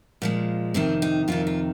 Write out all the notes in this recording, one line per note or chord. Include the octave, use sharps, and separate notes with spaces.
A#2 F3 G#3
F2 C3 D#3 C4
D#4
F2 C3 D#3 F4
F4